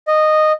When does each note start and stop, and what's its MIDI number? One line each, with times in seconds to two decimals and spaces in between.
0.07 0.52 75